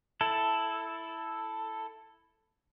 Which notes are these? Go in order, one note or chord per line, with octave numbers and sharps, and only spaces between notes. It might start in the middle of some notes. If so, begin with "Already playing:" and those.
E4 A4